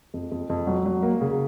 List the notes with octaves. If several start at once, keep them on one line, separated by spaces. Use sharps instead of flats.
F2
F2
F2
F#3
F#3
A#3
C#3